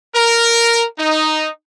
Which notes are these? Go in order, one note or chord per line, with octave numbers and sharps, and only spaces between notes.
A#4
D#4